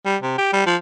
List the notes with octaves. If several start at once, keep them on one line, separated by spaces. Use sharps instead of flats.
G3
C3
G4
G3
F3